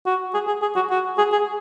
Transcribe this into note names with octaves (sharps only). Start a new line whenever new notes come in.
F#4
G#4
G#4
G#4
F#4
F#4
G#4
G#4